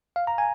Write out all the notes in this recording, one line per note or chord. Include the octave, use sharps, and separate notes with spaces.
F5
A#5
G#5